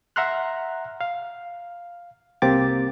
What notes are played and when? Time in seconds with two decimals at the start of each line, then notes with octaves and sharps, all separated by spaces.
0.16 E5 F#5 A#5 C6 F6 F#6
1.01 F5
2.42 C2 A#3 C4 G4 D6 A6